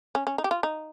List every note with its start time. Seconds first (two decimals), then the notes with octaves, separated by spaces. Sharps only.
0.15 C#4
0.27 C#4
0.38 D#4
0.44 G4
0.51 F4
0.63 D#4